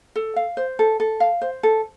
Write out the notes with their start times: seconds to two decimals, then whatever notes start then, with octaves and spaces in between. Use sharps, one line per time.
0.16 A4
0.36 F5
0.57 C5
0.79 A4
1.00 A4
1.20 F5
1.41 C5
1.63 A4